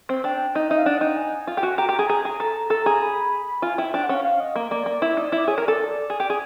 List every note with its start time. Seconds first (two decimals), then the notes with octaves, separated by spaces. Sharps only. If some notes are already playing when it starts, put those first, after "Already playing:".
0.09 C4
0.24 D4 G5
0.55 D#4
0.62 D#5
0.70 D#4 E5
0.78 F5
0.86 D4 F#5
1.01 D#4 G5
1.17 G#5
1.47 F4
1.57 G4
1.63 F#4
1.78 G4 A#5
1.89 G4
1.99 G#4
2.09 G#4
2.25 G#4
2.40 A4
2.70 A4
2.86 G#4
2.91 A#5
3.01 B5
3.62 F4 G#5
3.78 E4 G5
3.93 D4 G5
4.03 F#5
4.09 C#4 F5
4.24 F5
4.40 D#5
4.56 A#3
4.71 A#3 D5
4.86 A#3
5.02 E4
5.17 D#4
5.32 E4 D5
5.48 G#4 C#5
5.58 A#4
5.63 A4 D5
6.10 G#4
6.20 G4
6.30 G#4